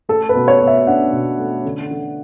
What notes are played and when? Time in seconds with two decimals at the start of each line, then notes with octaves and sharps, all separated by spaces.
0.09 A3 A4
0.29 B4
0.35 B2
0.48 C#5
0.61 B2
0.67 E5
0.87 D4 F#5
1.13 B2
1.39 A3
1.65 D3
1.91 D3